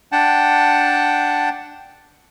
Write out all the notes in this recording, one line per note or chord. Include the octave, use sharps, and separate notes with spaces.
D4 F#5 G5 A5